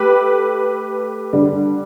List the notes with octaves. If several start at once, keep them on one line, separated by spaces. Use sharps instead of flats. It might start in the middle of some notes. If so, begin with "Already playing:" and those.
Already playing: A3 G4 B4
D3 G3 D4